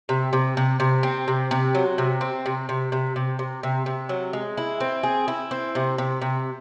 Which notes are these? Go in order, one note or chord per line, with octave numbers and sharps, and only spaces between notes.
C3
C3
C3
C3
C4
C3
C3
F#3
C3
C4
C3
C3
C3
C3
C3
C3
C3
F#3
G#3
E4
C4
G#4
E4
C4
C3
C3
C3